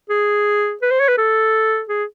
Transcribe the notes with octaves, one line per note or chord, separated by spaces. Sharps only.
G#4
B4
C5
C#5
B4
A4
G#4